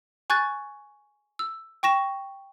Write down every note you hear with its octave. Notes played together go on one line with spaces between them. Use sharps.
G#5 C#6 F#6 G#6 A6
E6
G5 C#6 A#6 E7